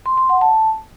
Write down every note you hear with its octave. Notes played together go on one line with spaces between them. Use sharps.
C6
C6
F#5
A5